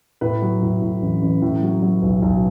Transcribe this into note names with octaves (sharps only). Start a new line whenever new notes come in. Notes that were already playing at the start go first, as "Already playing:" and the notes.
A2 B4
F#3
A2
A2
A1
A1
A2
F#3
F#3
B1
B1